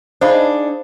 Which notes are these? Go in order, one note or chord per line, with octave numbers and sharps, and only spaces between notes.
D4 D#4 G#4 C5 F5 B5